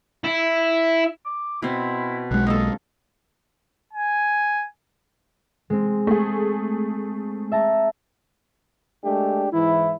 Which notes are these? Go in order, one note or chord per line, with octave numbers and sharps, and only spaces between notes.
E4
D6
B2 C4 E4
B1 G#3 F#5
A#3 A4 D#5
G#5
G#3 C4
A3 G#4
E5 A5 A#5
G#3 A3 D4 G4
G#2 E3 E4